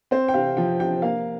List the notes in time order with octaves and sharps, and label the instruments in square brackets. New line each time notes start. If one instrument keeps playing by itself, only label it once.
[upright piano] C4 C5
G5
C3 F5
F3 G5
C3 G5
A#3 F5